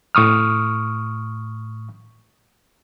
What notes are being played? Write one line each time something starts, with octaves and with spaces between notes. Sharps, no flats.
A2 C#6 D#6 F6